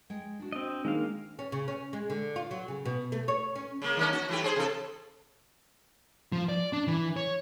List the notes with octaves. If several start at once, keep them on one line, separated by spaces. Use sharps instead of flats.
G#3 G5
D4 F#4
C4 D#5
D#3 G#3 A#3 F5
C#4
C#3
C#4
G#3
D3
F4
F#3
C#3
B2
A3
C#5
C#4
C#3 A#3
D#3 A#3 C#4
F#4
E3 A3 G4
G#4 C5
C3 A4
F3
D5
D4
E3
C#5